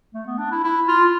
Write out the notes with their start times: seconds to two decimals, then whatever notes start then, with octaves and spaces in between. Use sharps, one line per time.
0.14 A3
0.26 B3
0.38 D4
0.51 E4
0.64 E4
0.88 F4